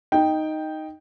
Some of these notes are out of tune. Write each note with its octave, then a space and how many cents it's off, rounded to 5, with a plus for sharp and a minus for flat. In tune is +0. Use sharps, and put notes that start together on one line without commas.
D#4 +0 G5 +0